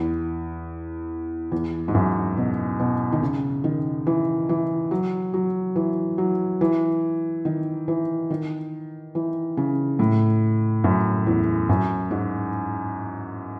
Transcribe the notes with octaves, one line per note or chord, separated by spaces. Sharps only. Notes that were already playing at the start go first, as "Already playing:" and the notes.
Already playing: E2
E2
G#2
F#2
B2
B2
D#3
C#3
D#3
E3
E3
F#3
F#3
E3
F#3
E3
D#3
E3
D#3
E3
C#3
A2
F#2
E2
F#2
G#2